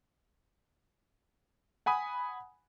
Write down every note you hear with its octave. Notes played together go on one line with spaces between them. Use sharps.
F#5 G#5 B5 D#6